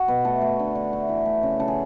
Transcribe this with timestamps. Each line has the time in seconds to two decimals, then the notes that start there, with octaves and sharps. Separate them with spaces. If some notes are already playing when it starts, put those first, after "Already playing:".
Already playing: F#4
0.08 B2 B4
0.25 A3 A4
0.41 A3
0.59 D3
0.75 D3
0.93 A3
1.09 E3
1.26 A3
1.43 C#3
1.60 C#3 A4
1.68 G#4